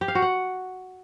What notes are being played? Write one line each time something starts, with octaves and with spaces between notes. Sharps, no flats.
G4
F5
F#4
F#5